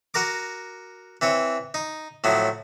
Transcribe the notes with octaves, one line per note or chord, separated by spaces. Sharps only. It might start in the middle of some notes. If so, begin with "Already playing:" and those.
F#4 A#4 A#5 D6
E3 C4 C#5
D#4
A2 F3 F#3